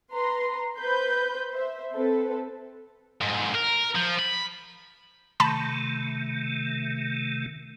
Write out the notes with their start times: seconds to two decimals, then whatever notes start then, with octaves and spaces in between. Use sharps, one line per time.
0.12 B4 A#5 C6
0.78 B4 C5 B5 G6
1.49 C5 E5
1.94 C4 A4 B4
3.21 F2 G#2
3.55 A#4
3.95 F3
4.19 B5
5.40 C3 D#3 A3 A5 B5